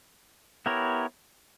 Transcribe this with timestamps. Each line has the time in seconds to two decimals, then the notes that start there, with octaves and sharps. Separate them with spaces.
0.66 B3 E4 G4 A#4 C#5